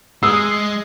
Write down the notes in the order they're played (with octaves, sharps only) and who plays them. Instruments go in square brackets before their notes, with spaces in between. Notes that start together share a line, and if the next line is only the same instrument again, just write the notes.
[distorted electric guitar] G#3 [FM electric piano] D#6 C7 [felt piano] E6